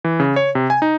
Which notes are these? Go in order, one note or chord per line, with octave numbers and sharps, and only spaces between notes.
E3
C#3
C#5
C3
G#5
D#4